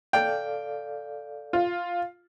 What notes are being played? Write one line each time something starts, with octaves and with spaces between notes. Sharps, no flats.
A4 D5 F5 G5
F4